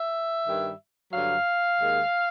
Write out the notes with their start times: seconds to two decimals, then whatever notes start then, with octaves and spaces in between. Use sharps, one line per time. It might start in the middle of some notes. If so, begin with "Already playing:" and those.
Already playing: E5
0.48 G2 D#3 G3
1.13 G2 D3 F#3 F5
1.78 D#2 D#3 G#3